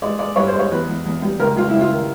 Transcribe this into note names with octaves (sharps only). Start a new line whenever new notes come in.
G#3 D5
G#3 D5
G2 C#5
C5
G#3
C#5
E2 B4
E2
E2
G3
C#2 A#4
C#2 F4
C#2 E4
F4
D#3